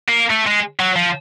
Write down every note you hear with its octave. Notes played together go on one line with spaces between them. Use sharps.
A#3
A3
G#3
F#3
F3